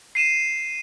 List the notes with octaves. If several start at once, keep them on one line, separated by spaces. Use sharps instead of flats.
C7 D#7 E7